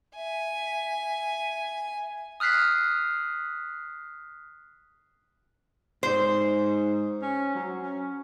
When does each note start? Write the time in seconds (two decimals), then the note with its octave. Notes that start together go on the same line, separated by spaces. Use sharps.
0.16 E5 G#5
2.40 D#6 F6 F#6 B6 C7
6.03 G#2 C5
7.22 C#4
7.55 F#3
7.82 C#4